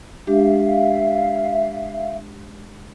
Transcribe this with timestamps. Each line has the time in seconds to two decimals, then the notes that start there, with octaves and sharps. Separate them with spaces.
0.27 G#3 D4 G4 E5 F5